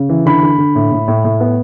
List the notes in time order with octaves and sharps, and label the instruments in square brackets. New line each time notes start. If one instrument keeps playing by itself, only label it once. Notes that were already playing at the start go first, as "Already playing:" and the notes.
Already playing: [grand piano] C#3
E3
D3 B5
D3
D3
A2
A2
A2
A2
B3